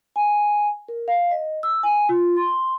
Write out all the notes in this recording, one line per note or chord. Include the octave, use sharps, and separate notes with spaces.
G#5
A#4
F5
D#5
E6
G#5
F4
C6